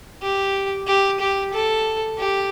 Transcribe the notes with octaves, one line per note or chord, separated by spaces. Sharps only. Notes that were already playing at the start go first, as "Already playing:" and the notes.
G4
G4
G4
A4
G4